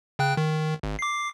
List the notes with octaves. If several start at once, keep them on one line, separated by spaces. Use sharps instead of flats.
C#3 G5 F#6
D#3
G#1
D6 C7